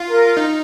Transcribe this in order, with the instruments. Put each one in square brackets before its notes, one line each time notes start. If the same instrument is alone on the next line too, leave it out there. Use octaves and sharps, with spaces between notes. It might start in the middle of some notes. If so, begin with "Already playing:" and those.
Already playing: [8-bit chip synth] F4
[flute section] A#4
[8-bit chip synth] D#4